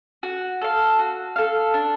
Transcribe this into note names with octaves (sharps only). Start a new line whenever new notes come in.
F#4
A4 F5
F#4
A4 F5
D4